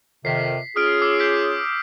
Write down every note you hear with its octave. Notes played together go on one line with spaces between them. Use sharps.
F2 C3 D#3 B6 C7
C#4 F4 G#4 D#6 F6 D7
D6 E6 C7
G6 B6 D7